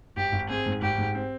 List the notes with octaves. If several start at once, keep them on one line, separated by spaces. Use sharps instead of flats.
G#1 G4
G#1
C4 G#4
G#2
G#1 G4
G#2
C4